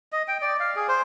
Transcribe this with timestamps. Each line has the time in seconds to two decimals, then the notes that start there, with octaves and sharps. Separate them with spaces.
0.12 D#5
0.28 G5
0.42 D5
0.60 F5
0.76 G#4
0.88 C5